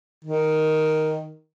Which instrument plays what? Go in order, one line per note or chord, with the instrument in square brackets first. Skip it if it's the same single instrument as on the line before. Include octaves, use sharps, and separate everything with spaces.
[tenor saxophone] D#3